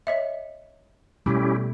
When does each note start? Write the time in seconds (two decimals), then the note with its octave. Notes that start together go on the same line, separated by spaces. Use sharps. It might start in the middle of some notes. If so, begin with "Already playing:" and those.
0.07 C#5 D#5 E5
1.26 B2 G3 A3 C#4 E4 G4